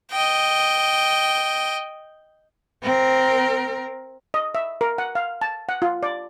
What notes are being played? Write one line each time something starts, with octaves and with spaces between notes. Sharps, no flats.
D#5 G5
C4 A#4
D#5
E5
A#4
F#5
F5
A5
F#5
F4
D5